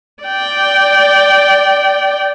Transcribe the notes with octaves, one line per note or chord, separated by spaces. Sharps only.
D5 G5